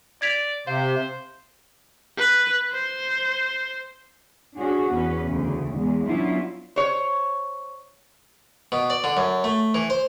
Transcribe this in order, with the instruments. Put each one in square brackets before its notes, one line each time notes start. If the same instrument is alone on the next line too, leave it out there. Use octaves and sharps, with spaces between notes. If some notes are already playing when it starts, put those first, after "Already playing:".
[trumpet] D5 [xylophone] G#6 B6 F7
[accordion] C3 [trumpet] C5 [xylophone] F5
[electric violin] B4
C5
[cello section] C#4 D4 F#4 G#4
E2 C#4 B4
D2 C#3
E2 G#3
F#3 B3 C#4 D4 E4 F4
[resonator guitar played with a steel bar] C5 C#5
[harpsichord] B2
D5
D3
F#2
A3
E3
C5